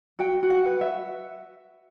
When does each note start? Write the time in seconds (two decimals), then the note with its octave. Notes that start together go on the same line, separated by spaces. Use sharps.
0.19 F#4 G5
0.43 F#4
0.50 F#5
0.66 B4
0.81 E5